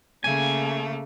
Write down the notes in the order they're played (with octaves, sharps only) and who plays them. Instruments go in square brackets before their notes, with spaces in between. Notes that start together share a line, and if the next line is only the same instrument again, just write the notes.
[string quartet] C#3 A3 A#3 [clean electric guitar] G#5